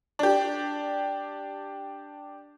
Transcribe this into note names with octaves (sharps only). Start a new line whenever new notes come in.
D4 G4